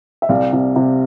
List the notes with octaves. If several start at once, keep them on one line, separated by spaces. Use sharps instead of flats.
E5
C2 D5 F5
C3
C3